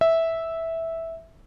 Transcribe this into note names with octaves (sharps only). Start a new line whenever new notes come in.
E5